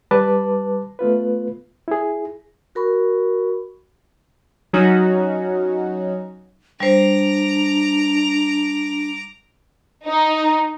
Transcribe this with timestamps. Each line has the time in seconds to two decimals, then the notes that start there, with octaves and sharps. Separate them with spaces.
0.11 G3 B4 A5 D6
0.99 A3 B3 F4 B4
1.88 E4 G#4
2.75 F#4 A#4 B5 C#6
4.73 F#3 C#4 D#4 F#4
6.80 G3 D4 C5 A#5 D6
10.05 D#4